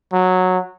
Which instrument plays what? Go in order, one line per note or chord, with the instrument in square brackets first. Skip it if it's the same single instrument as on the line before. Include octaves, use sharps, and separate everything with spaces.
[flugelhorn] F#3